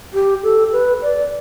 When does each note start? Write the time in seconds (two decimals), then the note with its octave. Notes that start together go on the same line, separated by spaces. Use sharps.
0.14 G4
0.43 A4
0.72 B4
1.02 D5